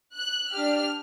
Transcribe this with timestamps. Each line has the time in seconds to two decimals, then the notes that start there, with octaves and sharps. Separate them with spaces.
0.15 F#6
0.51 D4 G4 F6